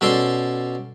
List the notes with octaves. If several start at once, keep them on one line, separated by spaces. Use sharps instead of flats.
B2 C#4 A4 D5 C6